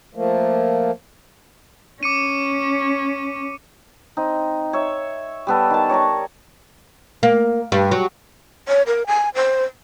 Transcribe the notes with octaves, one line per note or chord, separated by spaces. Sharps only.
F3 A3 A#3
C#4 D6 C#7 D#7
C4 D#4
C#5 E5
G3 B3 A4
D#3 A5
C#5 D5 A#5 C#6
A#3
G2
F#3
C#5
A#4
G#5
C5